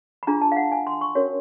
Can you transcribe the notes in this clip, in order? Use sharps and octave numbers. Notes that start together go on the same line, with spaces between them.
B5
D4 F4 G#4 A#5
A5
F5
F#5
G#5
C6
C#6
C#4 F#4 A#4 C#5